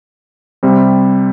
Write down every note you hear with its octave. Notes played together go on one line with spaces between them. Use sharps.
C3 G3 C4